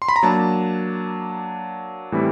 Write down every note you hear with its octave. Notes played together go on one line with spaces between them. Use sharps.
C6
B5
A#5
F#3 A#3 D4 A5
A2 E3 G3 C4 E4